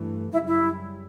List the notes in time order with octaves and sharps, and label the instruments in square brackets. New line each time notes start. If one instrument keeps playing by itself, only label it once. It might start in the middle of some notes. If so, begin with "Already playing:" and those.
Already playing: [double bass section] G2 E3 A3
[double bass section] F#2 C#3 G3 [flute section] E4
[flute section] E4